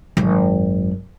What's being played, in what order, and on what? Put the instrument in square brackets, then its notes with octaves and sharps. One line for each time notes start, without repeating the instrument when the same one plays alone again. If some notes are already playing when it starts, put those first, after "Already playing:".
[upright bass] G#1 F#2